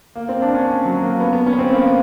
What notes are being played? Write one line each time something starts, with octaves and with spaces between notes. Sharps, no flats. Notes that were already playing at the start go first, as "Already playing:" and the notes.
A#3
C4
D4
C#4
F#3
A#3
B3
B3
C#4
B3
C4
A#3